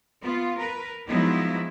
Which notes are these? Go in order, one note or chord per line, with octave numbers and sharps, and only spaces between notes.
B3 F4
A#4 B4
F3 F#3 G#3 B3 D#4 E4